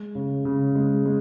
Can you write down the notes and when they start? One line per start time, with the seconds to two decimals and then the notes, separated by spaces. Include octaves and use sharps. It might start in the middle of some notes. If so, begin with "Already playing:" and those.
Already playing: G#3
0.15 C#3
0.45 C#3
0.75 G#3
1.05 G#3